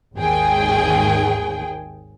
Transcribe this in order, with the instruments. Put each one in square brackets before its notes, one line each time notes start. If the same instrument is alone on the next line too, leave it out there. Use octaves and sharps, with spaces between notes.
[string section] G#1 D#2 G#4 G5